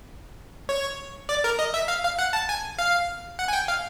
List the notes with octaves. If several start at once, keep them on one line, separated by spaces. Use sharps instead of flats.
C#5
D5
A#4
D#5
E5
F5
F5
F#5
A5
G#5
F5
F#5
G#5
G5
F5